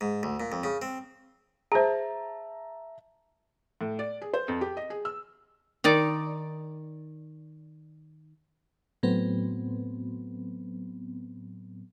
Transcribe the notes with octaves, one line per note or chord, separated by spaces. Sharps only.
G#2
D2
A#2
F2
C#3
C4
G#4 C5 E5 A5 A#5
A2
D5
G#4
C5
F2
G4
D#5
G#4
E6
D#3 D#4 D5
A2 F#3 B3 C4